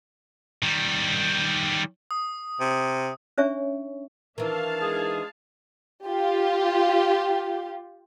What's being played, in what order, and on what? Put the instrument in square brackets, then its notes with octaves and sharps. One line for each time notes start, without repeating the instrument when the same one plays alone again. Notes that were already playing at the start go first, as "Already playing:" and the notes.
[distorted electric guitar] D#3 G3
[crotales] D#6
[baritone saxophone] C3
[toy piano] C#4 D4 C#5 E5 G#5 C#6
[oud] D#3 E3 [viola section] D4 F5 A5 [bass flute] A#4
[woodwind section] G#3 G#4
[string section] F4 G4